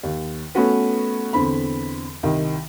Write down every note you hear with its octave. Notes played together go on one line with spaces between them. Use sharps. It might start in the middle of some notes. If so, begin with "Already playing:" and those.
D#2
A3 B3 C#4 F#4 B4
E2 D3 C4 B5
C2 D#3